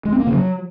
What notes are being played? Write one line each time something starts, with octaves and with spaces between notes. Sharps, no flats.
G#3
C4
A#3
C#3
F#3